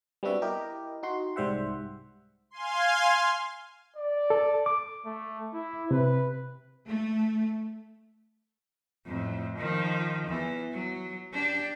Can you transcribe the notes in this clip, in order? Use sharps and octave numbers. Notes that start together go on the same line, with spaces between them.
G3 B3 C4 D4 F#4 E5
E4 G4 A#4 D#5
D#4 F#4 C6
C2 G#2 G3 C5 E5 F#5
F5 G#5 C6
D5
A4
D6
A3
E4
C3 B4
A3
F2 A2
D#3 F3
E2 E3
F#3
D4 G4